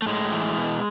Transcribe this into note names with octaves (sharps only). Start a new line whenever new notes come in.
A3
A2 G#3
E3
B2